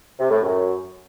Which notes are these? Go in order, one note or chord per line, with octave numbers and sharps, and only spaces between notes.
C3
A2
F#2